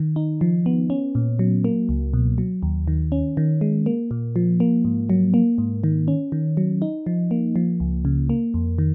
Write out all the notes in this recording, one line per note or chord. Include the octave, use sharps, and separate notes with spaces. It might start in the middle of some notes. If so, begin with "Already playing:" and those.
Already playing: D#3
D#4
F3
B3
C#4
A#2
F#3
A#3
C#2
B2
F#3
D#2
D#3
C#4
D#3
G#3
A#3
A#2
F3
A#3
G#2
F#3
A#3
G#2
D#3
C#4
D#3
F#3
D#4
F3
A#3
F3
C#2
C#3
A#3
F2
D#3